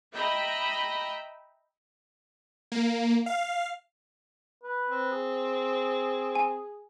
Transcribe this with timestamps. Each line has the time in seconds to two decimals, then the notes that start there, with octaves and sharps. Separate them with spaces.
0.13 D#5 E5 G5 A#5 B5
2.72 A#3
3.26 F5
4.64 B4
4.88 C4
5.12 G#4
6.35 G#5